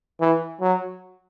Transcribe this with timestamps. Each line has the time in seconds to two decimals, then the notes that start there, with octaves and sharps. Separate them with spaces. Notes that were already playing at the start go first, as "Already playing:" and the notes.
0.20 E3
0.61 F#3